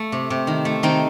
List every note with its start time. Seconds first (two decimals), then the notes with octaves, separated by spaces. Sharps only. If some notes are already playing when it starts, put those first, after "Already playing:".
Already playing: A3
0.12 C3
0.30 C3
0.47 D#3
0.65 A3
0.83 D#3 C4 D#4